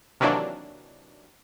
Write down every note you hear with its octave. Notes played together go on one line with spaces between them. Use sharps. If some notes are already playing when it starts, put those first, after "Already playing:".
C3 D#3 E3 F#3 A#3 D4